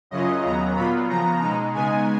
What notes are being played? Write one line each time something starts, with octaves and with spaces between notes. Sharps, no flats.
F#2 C#3 F#3 C#4 F4 D#5
D#2 C#3 F#3 B3 A#5
A#2 F#3 B3 F4 B5
C#3 F3 B3 A#5
B2 G#3 D#4 A#5
C#3 G#3 B3 D#4 G#5